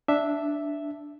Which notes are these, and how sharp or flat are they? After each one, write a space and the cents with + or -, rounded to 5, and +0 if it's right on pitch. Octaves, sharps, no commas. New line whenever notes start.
D4 +0 E5 +0